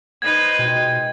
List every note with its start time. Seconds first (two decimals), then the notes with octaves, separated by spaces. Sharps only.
0.22 D#4 B4 C5 G#6
0.59 B2 G#3 G5